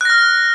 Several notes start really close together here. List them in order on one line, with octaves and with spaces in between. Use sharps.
F#6 A#6 F6